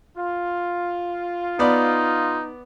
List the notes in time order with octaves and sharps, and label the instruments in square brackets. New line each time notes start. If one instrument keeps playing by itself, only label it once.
[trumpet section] F4
[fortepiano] B3 D5 B5 [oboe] D#4